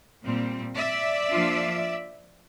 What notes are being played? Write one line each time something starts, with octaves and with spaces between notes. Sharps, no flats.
A#2 G3 C4
D5 E5
F3 A#3 D4 F4